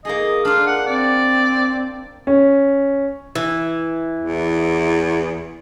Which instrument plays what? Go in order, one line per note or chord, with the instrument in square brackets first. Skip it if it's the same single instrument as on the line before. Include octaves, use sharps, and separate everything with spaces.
[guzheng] A#3 D#4 G#4 [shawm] D#5
[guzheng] D4 A#4 [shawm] F4
[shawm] F#5
[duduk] C4 [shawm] D5
[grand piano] C#4
[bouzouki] E3
[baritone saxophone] E2